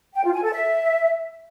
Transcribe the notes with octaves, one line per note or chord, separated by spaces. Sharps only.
G5
F4
G#5
A4
E5